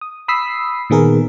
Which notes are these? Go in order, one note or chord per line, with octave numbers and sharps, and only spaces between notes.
D#6
B5 D#6 E6 B6 C7
A#2 D#3 B3 G#4 A#4